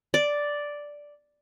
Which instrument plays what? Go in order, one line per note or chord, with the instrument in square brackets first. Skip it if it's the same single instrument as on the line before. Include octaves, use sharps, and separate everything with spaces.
[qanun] D5